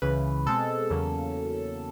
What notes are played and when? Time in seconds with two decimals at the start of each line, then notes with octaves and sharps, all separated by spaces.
0.02 C#2 C#3 E3 B4
0.46 B2 G#3 C4 A4
0.90 E2 C#3 F#3 A#3 C#4